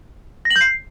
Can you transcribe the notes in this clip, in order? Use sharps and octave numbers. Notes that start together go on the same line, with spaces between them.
A#6
F#7
G6
C7